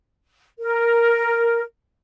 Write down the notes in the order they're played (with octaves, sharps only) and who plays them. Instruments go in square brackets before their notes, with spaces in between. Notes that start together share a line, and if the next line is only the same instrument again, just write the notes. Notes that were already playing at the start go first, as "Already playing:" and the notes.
[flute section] A#4